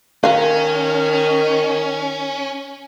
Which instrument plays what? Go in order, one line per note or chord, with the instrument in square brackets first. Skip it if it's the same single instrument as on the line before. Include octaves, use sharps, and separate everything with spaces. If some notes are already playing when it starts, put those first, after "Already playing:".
[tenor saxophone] D#3 [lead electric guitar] C#4 [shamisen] A#4 F5